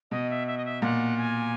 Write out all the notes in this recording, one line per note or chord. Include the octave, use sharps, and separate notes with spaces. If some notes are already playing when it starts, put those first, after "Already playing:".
B2 D#5
E5
E5
D#5
E5
A#2 F#5
G#5